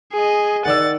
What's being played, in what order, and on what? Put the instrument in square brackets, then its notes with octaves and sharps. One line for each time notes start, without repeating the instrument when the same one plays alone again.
[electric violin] G#4 D#5
[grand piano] D#3 D5 E6 [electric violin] F#5 A6